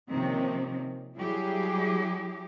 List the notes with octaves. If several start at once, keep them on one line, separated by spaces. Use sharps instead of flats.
C3 D#3 F3 A#3 C4 C#4
F#3 G3 E4 G4 G#4